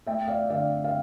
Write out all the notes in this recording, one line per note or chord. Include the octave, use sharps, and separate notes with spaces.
A3 E5 G5
D5 F5
D3 D5 F5
F5